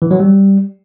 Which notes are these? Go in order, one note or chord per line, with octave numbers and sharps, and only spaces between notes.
E3
F#3
G3